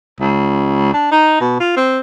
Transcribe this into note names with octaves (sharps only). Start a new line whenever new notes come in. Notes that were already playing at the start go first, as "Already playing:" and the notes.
C#2
D4
D#4
B2
F4
C4